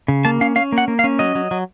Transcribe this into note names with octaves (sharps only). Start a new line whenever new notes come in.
C#3
A#3 A5
C#4 F5
C#4 F5
A#3
F#5
A#3
F5
C#4
F#3 D#5
F#3
F#3